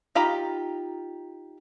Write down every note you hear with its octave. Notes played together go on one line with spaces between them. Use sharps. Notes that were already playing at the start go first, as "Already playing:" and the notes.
D#4 F4 G4 A#5 B5